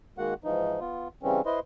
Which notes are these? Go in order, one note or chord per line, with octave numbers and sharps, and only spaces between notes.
D#3 G#3 A#3 F#4 F#5
G#2 E3 F3 D#4
B3 F4
C#3 E3 G3 C4 C#4
E4 B4 C5 D#5 C6